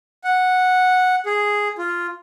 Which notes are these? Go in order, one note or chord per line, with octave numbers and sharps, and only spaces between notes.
F#5
G#4
F4